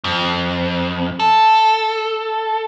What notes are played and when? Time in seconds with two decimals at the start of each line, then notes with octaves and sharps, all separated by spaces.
0.04 F2
1.20 A4